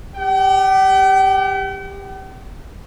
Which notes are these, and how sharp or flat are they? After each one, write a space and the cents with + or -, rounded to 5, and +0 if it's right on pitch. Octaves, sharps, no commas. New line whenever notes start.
G4 +20 G5 -45